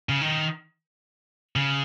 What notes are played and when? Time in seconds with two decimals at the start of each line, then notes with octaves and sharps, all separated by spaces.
0.09 C#3
0.21 D#3
1.56 C#3